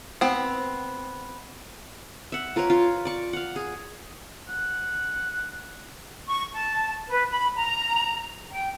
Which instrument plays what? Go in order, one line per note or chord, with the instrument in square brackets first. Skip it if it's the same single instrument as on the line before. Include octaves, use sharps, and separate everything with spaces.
[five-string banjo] B3 C4
[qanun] E5 F#5
F4 A#4 B4 C#5
F4
D5 C#6
F5 F#5
G#4
[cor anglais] F#5
[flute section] C#6
A5
B4
B5
A#5
G5